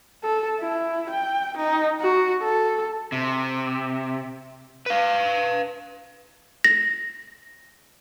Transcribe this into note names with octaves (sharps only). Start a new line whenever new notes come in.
A4
E4
G5
D#4
F#4
A4
C3
B4 F5
A#6